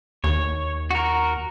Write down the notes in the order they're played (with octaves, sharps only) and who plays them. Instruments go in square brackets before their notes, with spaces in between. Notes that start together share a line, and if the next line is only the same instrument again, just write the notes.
[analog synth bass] D#2 [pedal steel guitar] C#5
[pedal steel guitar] F#4 A#4